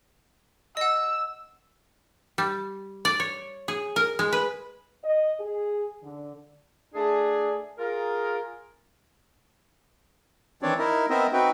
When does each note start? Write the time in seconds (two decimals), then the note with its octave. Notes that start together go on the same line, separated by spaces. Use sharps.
0.77 D#5 F#5 E6
2.38 G3
3.05 D5
3.20 C#5
3.68 G#4
3.96 A#4
4.19 G#3
4.32 B4
5.04 D#5
5.40 G#4
6.03 D3
6.94 A3 D4 G#4
7.78 F4 G#4 A#4
10.63 D#3 E3 C4 D4 C#5 D5
10.79 D#4 E4 A#4
11.10 B3 C4 A#4 C5 D#5 E5
11.33 C4 D#4 F#4 B4 G5